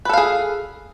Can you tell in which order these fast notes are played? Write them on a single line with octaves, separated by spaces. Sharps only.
B4 A4 F5 G#4